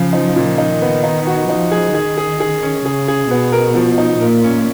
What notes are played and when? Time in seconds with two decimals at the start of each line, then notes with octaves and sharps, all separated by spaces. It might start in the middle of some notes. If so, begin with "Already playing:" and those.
Already playing: C#3 F3
0.13 D#4
0.36 A#2
0.58 D#3 D#4
0.82 B3
1.04 D#4
1.27 F#4
1.49 F3 D#4
1.72 G#4
1.94 D#3 G#4
2.18 G#4
2.40 G#4
2.63 C#4
2.85 C#3 G#4
3.08 G#4
3.30 B2 B3
3.52 A#4
3.75 F3
3.98 D#4
4.21 A#2 A#4
4.44 C#4